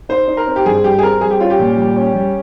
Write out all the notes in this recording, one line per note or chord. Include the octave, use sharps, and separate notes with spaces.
D#4 C5
D#4
A#4
C4
G4
G2 G#4
G3 G4
G#4
C4 A#4
G3 G#4
G4
C#4 F4
G4
A#2
G3
C#4
G3